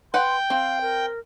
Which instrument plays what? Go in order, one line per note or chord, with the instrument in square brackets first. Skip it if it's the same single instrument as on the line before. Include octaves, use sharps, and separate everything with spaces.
[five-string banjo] B4 F#5 [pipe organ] G5 [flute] C6
[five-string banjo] C4 [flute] F5
[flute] A#4